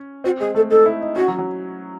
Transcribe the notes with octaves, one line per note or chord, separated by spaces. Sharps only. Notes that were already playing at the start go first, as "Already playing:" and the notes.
Already playing: C#4
C4 F#4
G#3 G#4
A3 A4
D#4 A4
E4
D#4
C#4 F#4
F#3
F#3